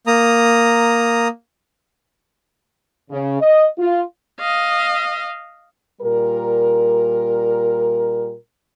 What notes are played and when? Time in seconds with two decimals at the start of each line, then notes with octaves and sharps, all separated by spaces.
0.07 A#3 A#5 D#6
3.10 C#3
3.40 D#5
3.78 F4
4.40 D#5 F5
6.01 A#2 G3 A#4